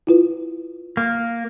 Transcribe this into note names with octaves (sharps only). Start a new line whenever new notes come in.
E4 F4 B4
A#3